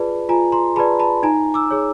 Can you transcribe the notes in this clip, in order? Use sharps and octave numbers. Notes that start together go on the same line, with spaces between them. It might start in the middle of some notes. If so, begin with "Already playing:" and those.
Already playing: F4 G#4 B4 D5 A5 B5
F4 G#5 A#5
A#5 C6
G#4 B4 D5 A5 B5
A5 B5
D#4 G#5 A#5
D6 E6
G#4 C#5